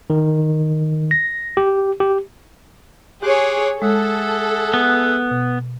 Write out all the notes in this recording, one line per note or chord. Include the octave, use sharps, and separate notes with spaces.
D#3
A#6
G4
G4
G4 G#4 C#5 C6 D6 F#6
G#3 G#4 A4 E5 F#5
B3
B2